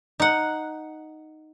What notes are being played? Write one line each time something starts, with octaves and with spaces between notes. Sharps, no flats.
D#4 F#5